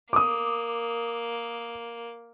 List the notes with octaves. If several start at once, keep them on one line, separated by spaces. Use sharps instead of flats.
A#3 D6 D#6